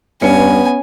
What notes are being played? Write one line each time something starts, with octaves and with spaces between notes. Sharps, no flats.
G2 B3 C#4 G#5 C#7